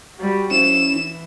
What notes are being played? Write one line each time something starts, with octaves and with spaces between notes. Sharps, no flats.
G3 F#4
F3 C#4 E4 E7
E3